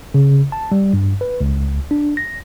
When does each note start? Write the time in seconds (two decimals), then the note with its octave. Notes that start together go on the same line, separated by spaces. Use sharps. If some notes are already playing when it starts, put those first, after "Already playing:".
0.14 C#3
0.52 A5
0.72 G3
0.93 G2
1.21 B4
1.41 C#2
1.91 D4
2.17 A#6